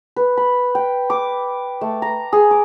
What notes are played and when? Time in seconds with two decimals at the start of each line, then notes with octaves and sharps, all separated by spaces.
0.16 B4
0.37 B5
0.75 G5
1.10 D6
1.81 A3
2.02 A#5
2.33 G#4
2.51 D6